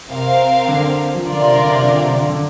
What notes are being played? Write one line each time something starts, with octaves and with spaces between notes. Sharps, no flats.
C3 C4 A#4 F5
D3
F3
D3 F4 A#4 D5
C3
D3
C3
D3
C3
D3
D3